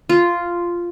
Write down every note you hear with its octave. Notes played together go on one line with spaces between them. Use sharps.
F4